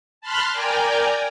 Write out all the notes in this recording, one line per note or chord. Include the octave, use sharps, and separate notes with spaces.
A5 B5 C6 F6 F#6
A#4 D5 G5 G#5 A#5